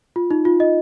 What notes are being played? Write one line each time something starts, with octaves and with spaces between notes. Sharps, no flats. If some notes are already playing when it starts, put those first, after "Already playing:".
F4
D#4
F4
D#5